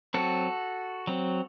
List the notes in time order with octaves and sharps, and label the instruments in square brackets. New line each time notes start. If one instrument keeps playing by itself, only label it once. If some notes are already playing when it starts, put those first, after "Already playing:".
[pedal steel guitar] F#3 C4 F#4 A4
F#3 C4